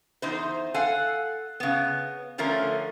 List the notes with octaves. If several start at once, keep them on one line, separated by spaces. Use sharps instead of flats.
E2 D#4 C5
A4 F5 F#5 G#5
C#3 B3
D3 F3 A3 C#4 A#4